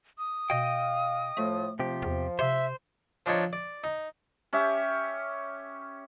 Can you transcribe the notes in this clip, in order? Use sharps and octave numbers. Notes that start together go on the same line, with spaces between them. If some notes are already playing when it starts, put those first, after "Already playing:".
D#6
B2 D#5 F5 G5
A2 F3 A3
C3 F3 G4
E2
C3 C5 E5
F3 D4 D#4 C#5
D5
D#4
C#4 G4 E5